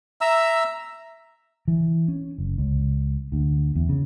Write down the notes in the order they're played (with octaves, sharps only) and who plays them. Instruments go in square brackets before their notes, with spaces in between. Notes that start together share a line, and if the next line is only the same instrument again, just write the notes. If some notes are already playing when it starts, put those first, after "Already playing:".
[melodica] E5 A#5 E6
[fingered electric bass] E3
C#4
F#1
C#2
D2
E2
C#3